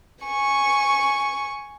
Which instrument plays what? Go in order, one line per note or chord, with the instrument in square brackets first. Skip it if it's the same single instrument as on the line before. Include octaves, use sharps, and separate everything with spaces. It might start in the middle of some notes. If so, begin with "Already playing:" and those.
[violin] G#5 C#6